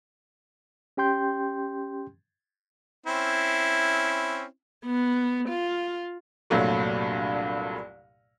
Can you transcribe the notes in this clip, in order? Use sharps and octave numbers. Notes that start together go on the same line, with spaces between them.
C#4 G4 G5 C6 G6
C4 C#4 E4
B3
F4
C2 G2 A#2 F#3 A3